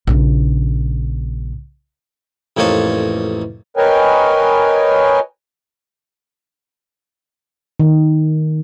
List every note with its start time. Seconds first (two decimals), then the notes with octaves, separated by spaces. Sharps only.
0.07 A#1 C#3
2.57 A1 F2 A#3 D#4 C#5 A5
3.77 A#4 B4 C#5 D#5 G5 G#5
7.80 D#3